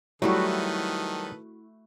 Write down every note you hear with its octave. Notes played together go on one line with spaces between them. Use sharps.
D#3 F#3 G3 A3 E4 F#4 A4 B4